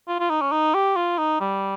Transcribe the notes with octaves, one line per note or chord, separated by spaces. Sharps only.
F4
F4
D#4
C#4
D#4
G4
F4
D#4
G3